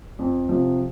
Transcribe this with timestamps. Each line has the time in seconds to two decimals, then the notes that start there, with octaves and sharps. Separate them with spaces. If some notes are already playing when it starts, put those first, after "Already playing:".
0.19 F2
0.49 C3 F3